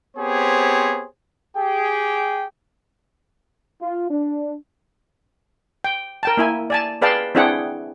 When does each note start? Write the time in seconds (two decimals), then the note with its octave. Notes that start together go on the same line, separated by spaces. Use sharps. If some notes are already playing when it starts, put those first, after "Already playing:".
0.17 B3 C4 G4 G#4 C5 C#5
1.57 G4 G#4 G5
3.82 F4
4.10 D4
5.84 G5
6.23 A#4 G5 A5
6.37 A#3 E4 G#5
6.70 D5 G#5 A5
7.02 G#4 B4 D5 F5 G5 A5
7.35 C4 D4 E4 G#4 F#5 G5